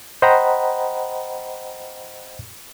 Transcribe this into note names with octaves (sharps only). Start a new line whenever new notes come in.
C5 D#5 F#5 G5 A#5 B5